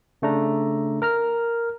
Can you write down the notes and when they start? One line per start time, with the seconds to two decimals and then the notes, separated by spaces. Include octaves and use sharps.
0.22 C#3 A3 D4 A#5
1.02 A#4 A#5 F6